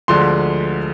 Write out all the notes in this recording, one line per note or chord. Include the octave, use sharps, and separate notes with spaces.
D2 D3 F3 G#3 C6